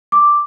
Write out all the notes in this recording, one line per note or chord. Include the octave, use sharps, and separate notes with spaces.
D6